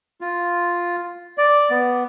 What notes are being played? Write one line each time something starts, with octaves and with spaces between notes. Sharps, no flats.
F4
D5
B3